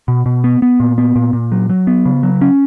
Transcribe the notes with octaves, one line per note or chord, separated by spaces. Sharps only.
B2
B2
B3
B3
A#2
B3
A#2
A#2
F#3
F#3
B3
C#3
F#3
C#4